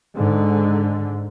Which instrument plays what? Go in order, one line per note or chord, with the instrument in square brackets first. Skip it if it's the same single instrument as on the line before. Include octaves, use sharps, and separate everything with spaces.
[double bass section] G#2 D3